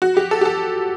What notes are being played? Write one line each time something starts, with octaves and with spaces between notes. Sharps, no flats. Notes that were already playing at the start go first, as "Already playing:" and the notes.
F#4
G4
A4
G4
A4